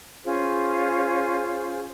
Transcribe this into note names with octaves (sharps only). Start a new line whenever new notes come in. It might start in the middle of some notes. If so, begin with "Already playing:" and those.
C#4 F4 G#4 C5